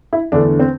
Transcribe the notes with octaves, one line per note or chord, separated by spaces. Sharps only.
E4
E2 D3 A3 D4
C4